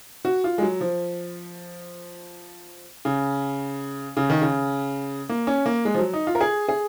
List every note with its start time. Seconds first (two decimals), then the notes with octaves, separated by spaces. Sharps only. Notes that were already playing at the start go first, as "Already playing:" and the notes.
0.25 F#4
0.44 F4
0.58 G#3
0.62 F#3
0.81 F3
3.05 C#3
4.17 C#3
4.30 D#3
4.42 C#3
5.29 A#3
5.47 C#4
5.66 A#3
5.85 G#3
5.94 F3
5.99 F#3
6.13 D#4
6.27 F4
6.35 A#4
6.41 G#4
6.69 G#4